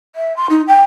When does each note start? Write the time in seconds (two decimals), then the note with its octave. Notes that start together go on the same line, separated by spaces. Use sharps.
0.16 E5
0.37 C6
0.50 D#4
0.68 G5